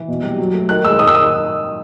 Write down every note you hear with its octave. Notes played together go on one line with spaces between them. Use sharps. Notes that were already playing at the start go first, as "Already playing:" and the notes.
Already playing: E3
B2
G3
F#3
A3
D#3 F#6
G#3 E6
D#3 D#6
E6
D#6